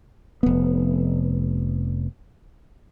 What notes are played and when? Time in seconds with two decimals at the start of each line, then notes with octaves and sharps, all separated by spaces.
0.43 F1 B3